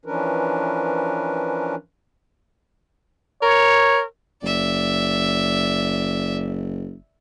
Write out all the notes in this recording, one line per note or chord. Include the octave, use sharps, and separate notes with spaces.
E3 F3 C#4 D4 A#4 B4
A#4 C#5
F#1 D5 E5